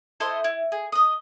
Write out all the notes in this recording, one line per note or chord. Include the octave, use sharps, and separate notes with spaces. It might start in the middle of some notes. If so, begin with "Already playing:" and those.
E4 A4 C5 D#5
E4
G#4
D#5 D#6